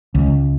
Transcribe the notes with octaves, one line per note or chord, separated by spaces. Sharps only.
C#2